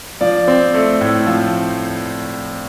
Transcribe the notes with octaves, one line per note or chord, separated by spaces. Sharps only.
F3 D5
C4
A3
A2
F3